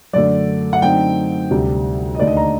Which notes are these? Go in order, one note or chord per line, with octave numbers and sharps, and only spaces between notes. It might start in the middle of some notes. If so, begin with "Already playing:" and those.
F#2 D3 A3 D5
F#5
F#2 D3 A3 C4 D#4 G5
D2 C3 G3
D#5
D#2 D3 A3 D4 D5
D#5
A#5